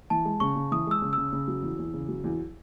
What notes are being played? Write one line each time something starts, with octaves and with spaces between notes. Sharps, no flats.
E3 A5
G#3
C#3 C#6
C#3
E3 D#6
G#3 E6
C#3
C#3 E6
C#3
F#3
E2
E2
C#3
F#3
E2